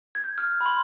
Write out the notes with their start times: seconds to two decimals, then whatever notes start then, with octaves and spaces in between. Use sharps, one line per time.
0.15 G#6
0.24 G6
0.38 F6
0.52 F6
0.61 B5
0.66 C6